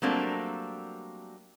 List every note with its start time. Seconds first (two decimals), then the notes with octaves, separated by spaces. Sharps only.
0.02 F#3 G3 A3 A#3 C4 D4